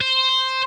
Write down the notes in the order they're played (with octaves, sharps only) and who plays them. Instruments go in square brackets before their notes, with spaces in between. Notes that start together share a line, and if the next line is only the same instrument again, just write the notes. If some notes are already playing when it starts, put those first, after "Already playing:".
[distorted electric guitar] C5